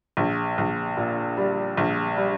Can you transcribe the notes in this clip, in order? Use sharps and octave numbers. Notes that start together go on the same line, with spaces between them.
A#1
A#1
A#2
G3
A#1
G3